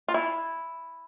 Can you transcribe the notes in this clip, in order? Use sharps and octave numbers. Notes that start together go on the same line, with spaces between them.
F4
E4